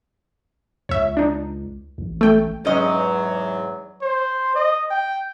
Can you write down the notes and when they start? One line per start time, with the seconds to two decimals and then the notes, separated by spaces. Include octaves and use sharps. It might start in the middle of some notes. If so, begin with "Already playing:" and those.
0.89 C#2 C#5 E5
1.17 D4 D#4
1.98 A1
2.21 A3 G5
2.65 E2 G#2 F#3 C#4 D#5
4.02 C5
4.55 D#5
4.91 G5